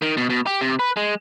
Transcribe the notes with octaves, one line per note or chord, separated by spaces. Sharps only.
D#3
B2
B2
G4
C3
B4
G#3